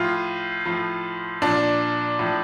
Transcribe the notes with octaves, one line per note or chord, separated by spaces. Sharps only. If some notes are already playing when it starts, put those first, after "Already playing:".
Already playing: A2 F3 F4
A2 F3
A#2 F3 D4
A2 F3